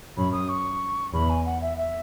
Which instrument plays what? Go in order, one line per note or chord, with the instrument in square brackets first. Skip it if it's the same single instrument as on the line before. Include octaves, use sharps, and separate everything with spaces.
[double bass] F#2 [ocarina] B5
[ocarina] D#6
C#6
[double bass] E2 [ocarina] B5
[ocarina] G#5
F#5
E5
E5